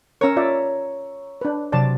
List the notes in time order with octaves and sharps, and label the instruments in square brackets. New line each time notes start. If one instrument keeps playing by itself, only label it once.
[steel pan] C#4 A#4 [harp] C#5 A#5 E6
[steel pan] F4 D5 E5
D4 B4
[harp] C3 F#3 A6 [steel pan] D5 A5